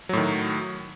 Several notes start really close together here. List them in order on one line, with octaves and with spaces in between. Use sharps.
F#3 A2 D#3